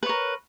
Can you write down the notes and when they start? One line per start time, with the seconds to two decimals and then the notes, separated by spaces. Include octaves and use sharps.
0.03 B4
0.06 C#5
0.09 A#4